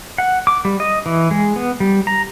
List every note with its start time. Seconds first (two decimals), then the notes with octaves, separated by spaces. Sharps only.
0.18 F#5
0.47 D6
0.65 G3
0.80 D#5
1.06 E3
1.31 G#3
1.56 B3
1.80 G3
2.07 A#5